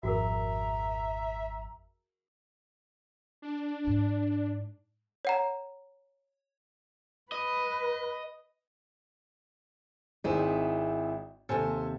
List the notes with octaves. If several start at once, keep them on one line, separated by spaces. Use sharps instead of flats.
G#1 F2 F#4 G#4 A#4 E5 A#5
D4
G#2
C#5 F#5 A#5
B4 D#5
G#1 C4 D#4 E4 G#4
D#2 C3 A4 C5 G#5